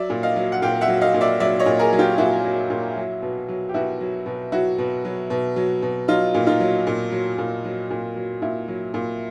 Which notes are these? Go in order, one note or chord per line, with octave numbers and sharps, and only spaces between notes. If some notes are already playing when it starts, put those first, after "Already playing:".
Already playing: F#3 D5 E5
A#2
D#5 F5
F#3
F#5
A#2 F5 G5
E5 F#5
F#3
D#5 F5
A#2
D5 E5
F#3 D5 E5
C#5 D#5
A#2
G#4 A#4
F#3
F4 G4
A#2 E4 F#4
F#3
A#2
F#3
B2
F#3
G4
B2 E4 F#4
F#3
B2
F#3 E4 F#4
B2
F#3
B2
F#3
B2
F#3 D#4 F4
A#2
D#4 F4
F#3
A#2
F#3
A#2
F#3
A#2
F#3
A#2 E4
F#3
A#2